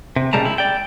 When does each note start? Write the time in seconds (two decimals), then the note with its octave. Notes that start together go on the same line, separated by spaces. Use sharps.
0.16 C3
0.33 A#2 C#3 G3 G#3 A5 A#5
0.45 E4
0.58 D5 G5